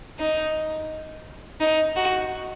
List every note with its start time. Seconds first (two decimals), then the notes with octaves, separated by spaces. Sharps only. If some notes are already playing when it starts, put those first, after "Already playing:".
0.19 D#4
1.60 D#4
1.96 F#4